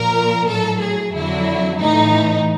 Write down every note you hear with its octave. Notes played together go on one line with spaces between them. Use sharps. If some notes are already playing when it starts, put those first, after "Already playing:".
Already playing: A#2 F3 A#4
F#3 A4
A2
G#4
F2 D3 F#3 E4
A2 E3 D#4